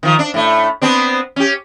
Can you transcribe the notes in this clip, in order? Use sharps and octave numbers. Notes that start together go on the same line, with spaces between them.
D#3 F3
D4
A2 A3
B3 C4 D4
C#4 G4